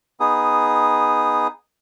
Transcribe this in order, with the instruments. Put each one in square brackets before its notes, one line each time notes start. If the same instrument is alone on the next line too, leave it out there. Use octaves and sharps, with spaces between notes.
[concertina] B3 D#4 G#4 D#6